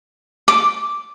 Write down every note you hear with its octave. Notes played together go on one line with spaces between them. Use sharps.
D6